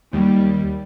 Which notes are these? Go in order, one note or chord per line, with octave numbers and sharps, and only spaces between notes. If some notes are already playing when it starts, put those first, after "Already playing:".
D#2 G3